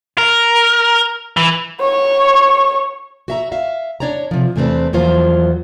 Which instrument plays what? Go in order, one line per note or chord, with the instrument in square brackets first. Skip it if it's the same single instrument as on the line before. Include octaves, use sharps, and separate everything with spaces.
[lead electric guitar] A#4
E3
[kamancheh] C#5 C#6
[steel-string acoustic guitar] F#4 E5 A#5
E5 F5
D4 C#5 D5 A#5
C3 F3
E2 C3 A3 C4 D4 B4
E2 F3 F#3 A#3 F4 C5